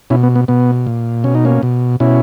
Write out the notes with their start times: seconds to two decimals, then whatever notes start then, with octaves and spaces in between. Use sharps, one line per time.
0.10 B2 C#4 E4
0.23 B3
0.36 B3
0.48 B2 B3
0.87 A#2
1.24 B2 C#4
1.35 D#4
1.45 A#3 C#4
1.63 B2
2.00 B2 C#4 E4